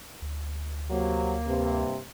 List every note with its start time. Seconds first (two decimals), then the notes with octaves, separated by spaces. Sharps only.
0.22 D2
0.91 C3 F#3 A#3
1.46 G2 C3